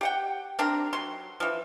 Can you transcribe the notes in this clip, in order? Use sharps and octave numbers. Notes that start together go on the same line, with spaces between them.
G4 F#5 G5
C4 D4 G4 A#4
F#3 C6
E3 F3